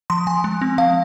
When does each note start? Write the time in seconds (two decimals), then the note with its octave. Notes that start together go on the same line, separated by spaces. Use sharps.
0.10 F3 C6
0.27 F3 G#5
0.44 G#3
0.62 C4
0.78 F3 F5